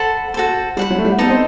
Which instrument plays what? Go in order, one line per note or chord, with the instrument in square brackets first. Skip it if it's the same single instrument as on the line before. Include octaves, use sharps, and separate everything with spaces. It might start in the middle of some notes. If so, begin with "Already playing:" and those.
Already playing: [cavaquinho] A4 C5 F#5 B5
F#4 A4 C5
[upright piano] G3 [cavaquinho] C5 F#5 B5
[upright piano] F#3
A3
G3
[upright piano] B3 [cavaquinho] D#4 A4 D#5
[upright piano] C4